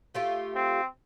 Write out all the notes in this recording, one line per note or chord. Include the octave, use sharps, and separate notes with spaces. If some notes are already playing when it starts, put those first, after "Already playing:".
A3 F4 G4
C4